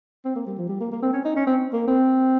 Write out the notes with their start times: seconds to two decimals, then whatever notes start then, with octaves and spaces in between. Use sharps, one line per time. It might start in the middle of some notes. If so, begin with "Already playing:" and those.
0.25 C4
0.36 A#3
0.47 G3
0.58 F3
0.69 G3
0.80 A#3
0.92 A#3
1.02 C4
1.13 C#4
1.25 D#4
1.36 C#4
1.47 C4
1.73 A#3
1.87 C4